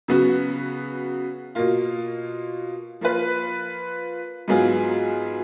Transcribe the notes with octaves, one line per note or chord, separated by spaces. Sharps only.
C#3 F#3 B3 F#4
B2 A#3 F4
F3 A#3 F4 B4
G#2 F#3 B3 F4 G#4